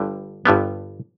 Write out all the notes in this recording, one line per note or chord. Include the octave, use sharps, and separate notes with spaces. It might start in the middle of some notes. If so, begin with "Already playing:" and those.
Already playing: G1 G2 D3 G3
G1 G2 D3 G3 B3